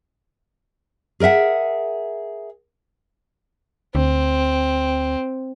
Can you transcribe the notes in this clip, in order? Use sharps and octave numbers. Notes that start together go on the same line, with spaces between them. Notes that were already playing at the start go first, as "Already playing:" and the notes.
G#4 A#4 D#5 E5 F#5
D2 C4